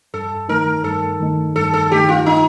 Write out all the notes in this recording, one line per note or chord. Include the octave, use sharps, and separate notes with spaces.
G2 A4
D#3 A3 D#4 A#4
G2 A4
D#3 A3 D#4
G2 A4
A4
D#3 A3 D#4 G4
F4
D#4